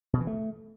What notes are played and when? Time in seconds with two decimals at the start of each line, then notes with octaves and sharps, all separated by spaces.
0.13 B2
0.20 E3
0.27 A3